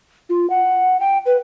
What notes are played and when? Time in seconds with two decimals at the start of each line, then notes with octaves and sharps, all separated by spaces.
0.29 F4
0.50 F#5
1.00 G5
1.26 B4